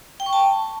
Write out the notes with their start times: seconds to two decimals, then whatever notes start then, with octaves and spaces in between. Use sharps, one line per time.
0.20 G5
0.26 C#6
0.33 A5